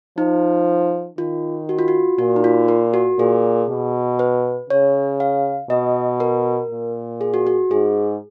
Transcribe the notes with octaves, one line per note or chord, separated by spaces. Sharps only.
F3 D#4
D#3 F4
F#4
F4
F#4
A#2 F#4
D#4
F4
A#4
F#4
A#2 G#4
B2
B4
C#3 C#5
F5
B2 D#5
A#4
A#2
G#4
F#4
F#4
G#2 G#4